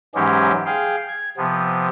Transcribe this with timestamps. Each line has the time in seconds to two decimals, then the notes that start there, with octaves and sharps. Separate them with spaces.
0.15 G#2 E3 F#3 G#3 C#4 G4
0.66 G#4 F5 G5
1.08 G#6
1.37 C3 F3 B3